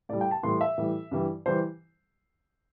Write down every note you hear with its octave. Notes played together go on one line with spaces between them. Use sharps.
A2 G3 D5
G5
A5
A2 E3 G3 C6
E5
A2 E3 G3
G2 E3 G3
E3 G3 C5